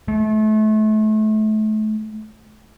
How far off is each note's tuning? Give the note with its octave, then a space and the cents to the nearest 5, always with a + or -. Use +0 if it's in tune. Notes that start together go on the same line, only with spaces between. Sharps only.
A3 -30